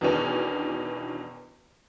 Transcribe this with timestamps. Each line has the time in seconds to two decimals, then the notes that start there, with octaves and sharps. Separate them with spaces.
0.01 E2 B2 D#3 E3 C#4 D4